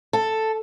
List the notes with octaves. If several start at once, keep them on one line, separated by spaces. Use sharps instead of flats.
A4